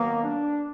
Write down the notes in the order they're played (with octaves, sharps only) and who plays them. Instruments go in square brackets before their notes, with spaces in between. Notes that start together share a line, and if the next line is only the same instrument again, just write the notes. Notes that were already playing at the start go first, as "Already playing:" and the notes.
Already playing: [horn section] D#3 F#3 B3 [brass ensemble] A#3
[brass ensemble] D4